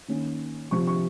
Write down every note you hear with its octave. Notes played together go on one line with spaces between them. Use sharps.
D#3 A#3 C#4
C3 F3 C4 C#6
C#6